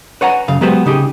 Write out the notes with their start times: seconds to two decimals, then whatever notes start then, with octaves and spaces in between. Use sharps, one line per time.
0.21 B4 C#5 F#5 G#5 A#5
0.48 F#2 C#3 F5
0.61 F#3 G#3 B3 G4 B4 C5
0.86 C#3 D#4 G4 G#4